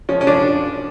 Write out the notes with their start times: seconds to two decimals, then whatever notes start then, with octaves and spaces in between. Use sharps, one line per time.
0.09 F3 C#4
0.21 C#4
0.27 F3 D4